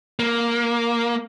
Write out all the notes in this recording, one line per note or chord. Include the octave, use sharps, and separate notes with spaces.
A#3